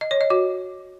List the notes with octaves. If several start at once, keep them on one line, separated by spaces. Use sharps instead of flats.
D#5
C#5
D#5
F#4